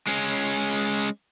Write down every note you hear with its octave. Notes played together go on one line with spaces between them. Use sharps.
G#3 C#4